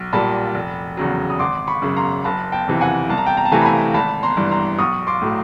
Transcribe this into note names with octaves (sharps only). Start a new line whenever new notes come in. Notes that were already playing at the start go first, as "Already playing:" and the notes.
Already playing: B1
A#2 G3 A5 B5
F1
E2 C#3 F#3
D#6
G#1 C6 D6
B5 C#6
F#2 C#3
A#5 C6
F#1 A5 B5
G5 A5
F2 C3 E3
F#5 G#5
C2 A5
A#5
G5 A5
A#5
A5
C3 E3 A3 G#5 A#5
B5
G#5 A#5
G#1 A5 B5
A#5 C6
G2 E3
A#5 C6
B1 C#6 D#6
C6 D6
A2 F#3 A3